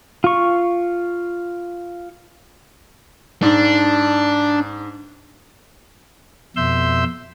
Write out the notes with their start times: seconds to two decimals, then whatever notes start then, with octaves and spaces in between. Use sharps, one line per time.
0.24 F4 C#6
3.43 G#2 D4
6.56 F2 B2 E5 C6 E6 G6